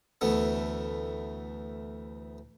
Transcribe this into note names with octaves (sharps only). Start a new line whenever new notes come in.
D2 E3 A3 B3